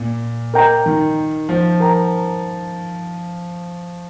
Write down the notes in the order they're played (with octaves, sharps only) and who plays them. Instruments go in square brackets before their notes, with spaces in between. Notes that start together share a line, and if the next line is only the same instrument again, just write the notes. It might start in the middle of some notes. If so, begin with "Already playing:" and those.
Already playing: [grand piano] A#2
[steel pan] A#4 D#5 G5 A#5
[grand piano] D#3
F3
[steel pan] A#4 G5 A#5